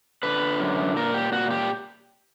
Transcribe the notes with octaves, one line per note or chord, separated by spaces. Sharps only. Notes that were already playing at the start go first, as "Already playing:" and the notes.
D3 B4
F#2
A#2 A#4
G4
A#2 F#4
G4